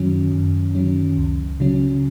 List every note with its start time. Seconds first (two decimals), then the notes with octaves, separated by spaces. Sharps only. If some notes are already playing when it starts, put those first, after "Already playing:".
Already playing: F#2 D#3 F#3 C#4
0.32 F#2
0.75 D#3 F#3 C#4
1.17 C#2
1.60 C#3 F#3 C#4